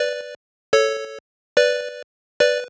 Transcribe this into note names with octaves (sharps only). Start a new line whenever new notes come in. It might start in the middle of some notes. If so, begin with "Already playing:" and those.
Already playing: B4 D5
A4 C#5
B4 D5
B4 D5